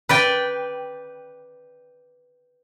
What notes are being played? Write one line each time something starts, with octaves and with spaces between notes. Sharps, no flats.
B4 D5 G5